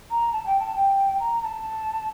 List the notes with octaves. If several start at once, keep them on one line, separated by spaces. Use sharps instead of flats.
A#5
A5
G5
A5
G5
A#5
A#5
A5